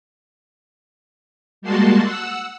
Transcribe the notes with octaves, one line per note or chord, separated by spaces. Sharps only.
G3 G#3 A#3 F#4 A5 C6
F#5 E6